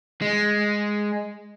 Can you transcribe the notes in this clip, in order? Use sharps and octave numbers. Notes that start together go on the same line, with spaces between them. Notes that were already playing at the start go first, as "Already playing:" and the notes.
G#3